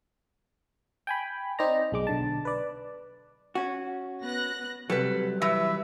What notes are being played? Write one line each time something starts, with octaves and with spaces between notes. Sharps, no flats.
G5 G#5 B5
C4 D#4 C5 D5 A#5
B1 G#3 D6
B1 D3 A5
B4 D5
C#4 F#4
B3 F#6 A#6
C3 F#3 G3 A4 B4
E3 B4 E5